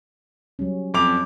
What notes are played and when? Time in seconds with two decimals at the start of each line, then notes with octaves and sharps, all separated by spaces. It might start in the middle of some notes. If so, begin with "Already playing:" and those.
0.59 F#3 G3 C#4
0.94 F2 D6 F7